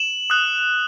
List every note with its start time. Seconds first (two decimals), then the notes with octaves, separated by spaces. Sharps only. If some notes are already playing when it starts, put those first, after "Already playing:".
Already playing: E7 F#7
0.30 D#6 F#6